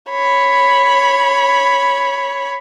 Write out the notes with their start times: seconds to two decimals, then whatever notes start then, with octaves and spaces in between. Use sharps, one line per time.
0.10 C#5 B5